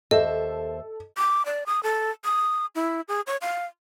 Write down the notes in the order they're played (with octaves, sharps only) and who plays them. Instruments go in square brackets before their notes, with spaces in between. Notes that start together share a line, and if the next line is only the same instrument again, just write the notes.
[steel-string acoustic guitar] D#2 C5 E5 [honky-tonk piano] A4 [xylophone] D#5
[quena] D6
D5
D#6
A4
D#6
E4
G#4
C#5
F5